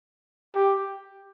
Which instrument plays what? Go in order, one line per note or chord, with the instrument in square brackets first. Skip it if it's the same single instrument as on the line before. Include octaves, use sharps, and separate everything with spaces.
[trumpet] G4